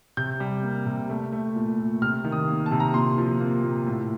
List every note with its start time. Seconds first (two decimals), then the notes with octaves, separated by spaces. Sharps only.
0.17 C3 G6
0.40 G3
0.63 A#3
0.86 C3
1.09 A3
1.33 A3
1.55 A#2
1.79 A#2
2.02 C3 F6
2.24 D#3
2.32 D#6
2.48 A#3
2.66 A5
2.71 C3
2.80 A#5
2.94 A#2 C6
3.18 F3
3.40 A#3
3.63 A#2
3.86 A2